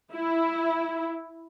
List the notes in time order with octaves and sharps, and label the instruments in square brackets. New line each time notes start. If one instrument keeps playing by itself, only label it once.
[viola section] E4